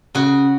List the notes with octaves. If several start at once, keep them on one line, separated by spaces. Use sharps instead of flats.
C#3 F#4